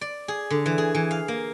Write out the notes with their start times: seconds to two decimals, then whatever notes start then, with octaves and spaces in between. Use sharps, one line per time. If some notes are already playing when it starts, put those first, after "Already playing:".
0.01 D5
0.28 G#4
0.50 D3
0.66 E3
0.78 G#4
0.95 E3
1.11 F5
1.28 A#3